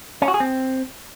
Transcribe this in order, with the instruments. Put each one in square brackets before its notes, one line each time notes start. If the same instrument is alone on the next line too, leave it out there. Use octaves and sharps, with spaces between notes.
[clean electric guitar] C#4
F#4
G#4
C4